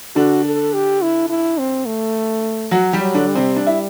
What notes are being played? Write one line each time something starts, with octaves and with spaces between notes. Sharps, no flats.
D3 D4 F#4
A4
G4
E4
E4
C4
A3
F#3 F#4
G3 G4
F#3
D3 D4
G3
C3 C4
D4
E4